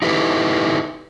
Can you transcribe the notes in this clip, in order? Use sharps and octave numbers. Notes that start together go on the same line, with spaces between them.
D#4 E4 G4 A4 B4